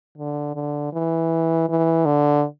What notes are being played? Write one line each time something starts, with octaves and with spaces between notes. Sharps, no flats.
D3
D3
E3
E3
D3